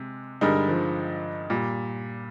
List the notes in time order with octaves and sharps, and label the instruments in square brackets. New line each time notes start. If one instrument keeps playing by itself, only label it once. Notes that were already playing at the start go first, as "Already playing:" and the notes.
Already playing: [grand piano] C3 [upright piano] G#3
[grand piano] G2 D3 G#3 D#4 A#4 [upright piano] G3
[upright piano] F3
[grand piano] A#2 [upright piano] G3